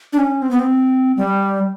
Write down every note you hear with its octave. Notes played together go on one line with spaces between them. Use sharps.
D4
C#4
C4
B3
C4
G3